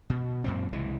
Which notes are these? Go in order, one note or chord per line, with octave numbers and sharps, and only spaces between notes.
B2
F#2 A#2 C4
C2 C#3 E3 G#3